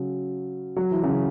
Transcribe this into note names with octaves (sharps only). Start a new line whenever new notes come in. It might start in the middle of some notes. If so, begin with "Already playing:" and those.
Already playing: C#3 F#3
F#3
E3
C#3 F#3